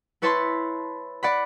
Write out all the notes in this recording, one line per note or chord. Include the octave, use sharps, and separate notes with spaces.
E4 B4 C#5 A5 B5 C6
D5 F#5 B5